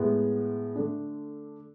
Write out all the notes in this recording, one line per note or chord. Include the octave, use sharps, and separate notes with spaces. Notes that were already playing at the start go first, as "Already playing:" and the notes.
Already playing: A2 G#3 B3
D3 A3 D4